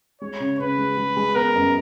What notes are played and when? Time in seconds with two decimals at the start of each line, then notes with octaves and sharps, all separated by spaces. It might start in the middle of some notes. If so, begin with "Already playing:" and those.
0.21 G#3 C#5
0.40 C#3
0.59 C#3 B4
0.78 G#3
0.97 G#3
1.17 G#3
1.35 B3 A#4
1.55 F#2